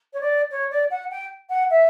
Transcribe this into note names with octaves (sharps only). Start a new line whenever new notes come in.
C#5
D5
C#5
D5
F#5
G5
F#5
E5